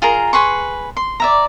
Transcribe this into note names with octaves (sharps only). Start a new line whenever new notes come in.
F4 G#4 A#4 A#5
G#4 B4 C6 C#6
C6
D5 E5 A#5